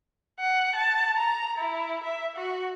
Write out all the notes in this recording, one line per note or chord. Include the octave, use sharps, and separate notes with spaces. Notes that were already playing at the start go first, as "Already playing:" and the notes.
F#5
A5
A#5
E4
E5
F#4